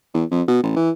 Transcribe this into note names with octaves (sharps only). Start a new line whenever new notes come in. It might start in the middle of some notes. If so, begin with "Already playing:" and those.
E2
F2
B2
A1
E3